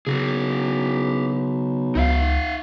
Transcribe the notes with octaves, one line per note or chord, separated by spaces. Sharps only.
B1 C#3 F#4 G#4
C#2 D#4 E5 F5